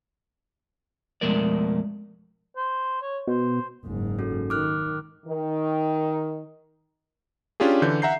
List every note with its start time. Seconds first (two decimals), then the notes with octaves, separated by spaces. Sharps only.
1.21 F2 B2 G#3 A3 A#4 D5
2.57 C5
3.02 C#5
3.27 B2 C5
3.85 F#1 G#2
4.19 C#4 F#4 A4
4.50 D#3 D6 F6 F#6
5.26 D#3
7.60 C#4 D4 F4 G4 G#4
7.82 D3 E3 G6
8.02 E5 F#5 A#5 G6 C7